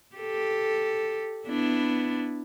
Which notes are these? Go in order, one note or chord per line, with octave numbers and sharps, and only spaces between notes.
G4 A4
B3 D4 E4